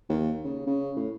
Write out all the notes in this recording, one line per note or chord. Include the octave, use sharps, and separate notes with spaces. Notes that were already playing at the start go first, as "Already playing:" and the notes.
D#2
C#3
C#3
A2